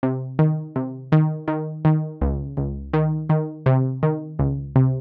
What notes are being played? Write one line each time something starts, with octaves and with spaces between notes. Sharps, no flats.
C3
D#3
C3
D#3
D#3
D#3
C#2
C#2
D#3
D#3
C3
D#3
C#2
C3